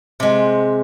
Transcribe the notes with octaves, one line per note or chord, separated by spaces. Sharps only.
C3 G#3